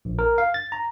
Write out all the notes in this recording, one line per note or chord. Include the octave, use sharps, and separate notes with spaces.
A#1
A#4
F5
A6
A#5